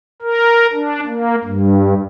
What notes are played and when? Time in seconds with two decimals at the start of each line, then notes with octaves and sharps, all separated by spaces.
0.22 A#4
0.73 D4
1.07 A#3
1.44 G2